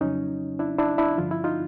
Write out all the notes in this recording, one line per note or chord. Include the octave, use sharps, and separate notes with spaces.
F2 C#3 F#3 C#4 D#4
D4 E4
D4 E4
D4 E4
G2 D3 F3 F4
E4
D#4 F4